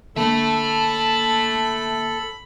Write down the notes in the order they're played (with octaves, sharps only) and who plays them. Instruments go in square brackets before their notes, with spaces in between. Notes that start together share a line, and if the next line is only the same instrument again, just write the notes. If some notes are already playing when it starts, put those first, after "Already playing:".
[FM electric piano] D3 A#3 [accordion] A4 [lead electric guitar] E5 A5 [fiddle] B5